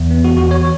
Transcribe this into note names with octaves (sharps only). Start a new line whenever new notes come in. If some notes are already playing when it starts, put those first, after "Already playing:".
Already playing: E2
B3
F#4
E2 F#4
C#5